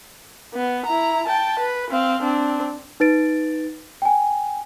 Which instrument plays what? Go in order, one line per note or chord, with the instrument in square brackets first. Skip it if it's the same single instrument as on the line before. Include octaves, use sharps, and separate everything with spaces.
[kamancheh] B3
E4 A#5
G5 A5
B4
C4 F5
C4 D4
[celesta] D#4 B4 A6 D7
G5 G#5